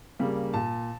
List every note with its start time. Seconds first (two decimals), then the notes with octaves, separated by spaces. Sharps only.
0.19 C#3 G3 A#3
0.54 A#2 A5